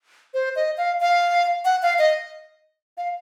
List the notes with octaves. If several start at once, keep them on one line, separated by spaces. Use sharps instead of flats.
C5
D#5
F5
F5
F#5
F5
D#5
F5